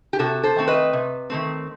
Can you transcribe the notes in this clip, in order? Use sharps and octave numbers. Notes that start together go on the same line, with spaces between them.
G4
C3 F#4 A4
A4 C5
D#3 A3 C4
B4 D#5
C3
D#3 A3 C4